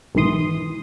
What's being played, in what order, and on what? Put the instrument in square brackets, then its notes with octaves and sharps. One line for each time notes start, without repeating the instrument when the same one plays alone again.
[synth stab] B1 G#2 D#3 E3 C6 D#6